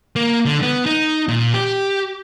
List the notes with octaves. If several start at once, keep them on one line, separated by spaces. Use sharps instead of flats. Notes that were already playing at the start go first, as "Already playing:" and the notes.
A#3
D3
B3
D#4
A#2
G4